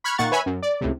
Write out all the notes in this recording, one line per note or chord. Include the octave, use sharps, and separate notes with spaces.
B5 C#6 F6 F#6 G#6
A#2 D#3 A#3 F#5 C#6 A6
B4 C#5 E5 G#5 B5
F#2
D5
C#2 A2 C3